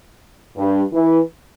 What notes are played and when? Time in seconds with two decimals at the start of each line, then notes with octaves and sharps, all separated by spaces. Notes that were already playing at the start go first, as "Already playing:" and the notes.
0.57 G2
0.93 E3